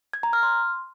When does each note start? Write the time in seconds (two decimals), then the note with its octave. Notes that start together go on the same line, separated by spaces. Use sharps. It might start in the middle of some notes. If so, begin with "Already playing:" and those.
0.13 G#6
0.23 A#5
0.33 F6
0.43 C6